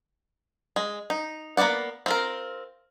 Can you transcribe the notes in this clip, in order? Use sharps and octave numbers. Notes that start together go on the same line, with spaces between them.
G#3
D#4
A#3 B3 E4 D5 F#5
C4 F4 A#4